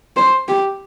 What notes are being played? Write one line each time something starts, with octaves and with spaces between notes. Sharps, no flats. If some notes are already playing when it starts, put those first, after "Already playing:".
C5
G4